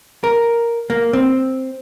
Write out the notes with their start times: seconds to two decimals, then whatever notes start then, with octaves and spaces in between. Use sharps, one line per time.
0.24 A#4
0.90 A#3
1.13 C4